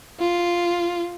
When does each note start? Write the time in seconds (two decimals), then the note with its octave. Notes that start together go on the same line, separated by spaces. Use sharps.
0.20 F4